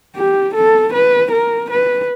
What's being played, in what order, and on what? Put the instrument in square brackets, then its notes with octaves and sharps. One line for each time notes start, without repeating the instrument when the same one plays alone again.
[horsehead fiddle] G4
A4
B4
A#4
B4